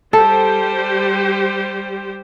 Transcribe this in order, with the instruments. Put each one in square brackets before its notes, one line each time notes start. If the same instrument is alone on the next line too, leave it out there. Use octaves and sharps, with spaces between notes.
[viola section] G3 G4 C5 [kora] A4